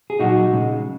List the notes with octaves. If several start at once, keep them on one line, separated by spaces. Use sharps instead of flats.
G#4
A#2 F#3 D#4 F#4
C#3 G#3